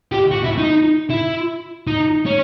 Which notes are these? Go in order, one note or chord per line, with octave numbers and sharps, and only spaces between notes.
G4
F#4
E4
D#4
E4
D#4
C#4